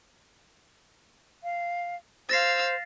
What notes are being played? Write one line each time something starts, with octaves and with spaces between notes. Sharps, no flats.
F5
C5 F5 E6 A6 A#6 C7